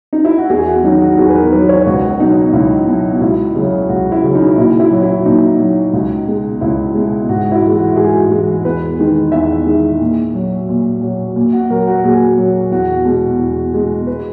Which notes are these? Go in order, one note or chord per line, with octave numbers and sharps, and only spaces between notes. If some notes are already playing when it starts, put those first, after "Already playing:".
D#4
E4
F#4
E2 G#4
F#4
D#3 F#3 D#4
F#4
E2 G#4
B4
A#4
D#3 F#3 B4
C#5
C#2 F#4
B2 F#3 D#4
C#2 E4
B2 F#3
C#2 E4
C#3 F#3
C#2 F#4
E4
C#3 F#3
D#4
A#2 E4
E4
F#3
E4
A#2 D#4
F#3
C#2
B2 G#3
C#2 E4
B2 G#3
G#2 F#4
E4
E3 G#3
F#4
G#2 G#4
E3 G#3
E2 B4
D#3 G#3
E2 E5
D#3 G#3
A#2
F#3
A#2
F#3
A#2
F#4
F#3 A#4
F#4
A#2 G#4
F#3
E2 F#4
B2 G#3
E2
B2 G#3
B4